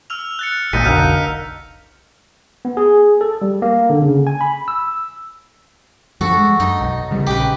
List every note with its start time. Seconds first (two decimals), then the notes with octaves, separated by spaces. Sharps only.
0.10 E6 F6 F7
0.39 F#6 A6 C#7
0.73 G#1 A#2 D#4 D#5 A5 B6 C#7 D#7
0.85 F1 B1 D3 D#4 A#4 F5 F#6 C#7
2.65 B3
2.77 G#4
3.21 A4
3.42 G3
3.62 A#3
3.90 D3
4.02 C#3
4.27 G#5
4.41 B5
4.68 E6
6.21 G2 F3 F#4 A4
6.38 G#3
6.60 F#2 D#4
6.81 B1
7.11 C#3 G3
7.27 A#1 C#3 G4 B4